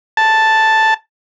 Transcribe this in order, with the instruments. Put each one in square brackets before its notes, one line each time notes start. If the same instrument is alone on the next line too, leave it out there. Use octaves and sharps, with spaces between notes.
[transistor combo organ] A5